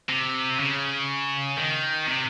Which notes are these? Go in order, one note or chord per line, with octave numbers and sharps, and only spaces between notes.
C3
C#3
D#3
C3